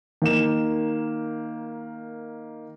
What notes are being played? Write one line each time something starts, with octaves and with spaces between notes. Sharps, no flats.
D#3 A#3 E7